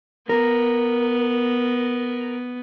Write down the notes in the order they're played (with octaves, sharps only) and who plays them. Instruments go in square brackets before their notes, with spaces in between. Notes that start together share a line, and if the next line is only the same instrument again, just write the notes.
[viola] B3 [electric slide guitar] A#4